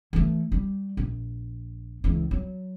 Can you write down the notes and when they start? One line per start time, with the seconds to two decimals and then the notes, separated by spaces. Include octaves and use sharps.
0.13 E3 A3
0.52 G3
0.97 A#1
2.04 C#2 E3
2.31 F#3